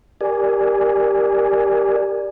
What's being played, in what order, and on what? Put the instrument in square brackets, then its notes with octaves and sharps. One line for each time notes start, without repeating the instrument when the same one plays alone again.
[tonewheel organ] G4 A#4 D5 G#5